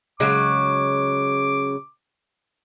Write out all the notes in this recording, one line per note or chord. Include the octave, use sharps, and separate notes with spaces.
C#3 F#3 G#3 D6